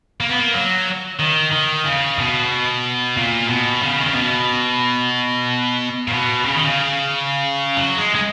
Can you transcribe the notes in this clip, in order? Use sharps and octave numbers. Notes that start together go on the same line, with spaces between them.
A#3
B3
A#3
F#3
D#3
D#3
C#3
B2
A#2
B2
C#3
D#3
C#3
B2
A#2
B2
C#3
D#3
C#3
F#3
G#3
G#3